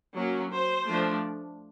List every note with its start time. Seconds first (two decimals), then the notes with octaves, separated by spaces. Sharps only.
0.15 F#3 A#3 C#4
0.52 C5
0.88 F3 A3 D4